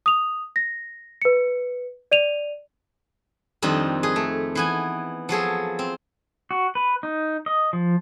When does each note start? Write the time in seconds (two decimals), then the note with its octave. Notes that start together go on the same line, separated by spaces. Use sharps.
0.06 D#6 F7
0.56 A#6
1.22 B4 C#7
2.12 D5 D#7 F7
3.62 F2 D#3 G3 C4 D4 D#4
4.03 D#4 G#4 B4
4.16 A3
4.55 E3 B3 G#5
5.29 F3 F#3 G#4 A4
5.79 C4
6.51 F#4
6.75 B4
7.03 D#4
7.46 D#5
7.73 F3